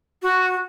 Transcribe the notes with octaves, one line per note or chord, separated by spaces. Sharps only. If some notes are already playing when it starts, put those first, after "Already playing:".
F#4